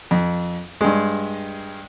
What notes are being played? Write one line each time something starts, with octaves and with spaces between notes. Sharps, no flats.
F2
G2 G#3